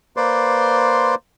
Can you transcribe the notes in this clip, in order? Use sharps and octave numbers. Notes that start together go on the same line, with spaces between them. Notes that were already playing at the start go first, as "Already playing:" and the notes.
A#3 B4 C5 D5 C6